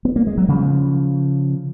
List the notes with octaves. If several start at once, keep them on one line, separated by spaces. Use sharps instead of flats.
B3
A#3
G#3
F#3
C#3 F3